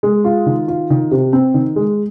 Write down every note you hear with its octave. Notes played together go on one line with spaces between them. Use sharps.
G#3
F4
D#3
F4
D#3
C3
C4
D#3
G#3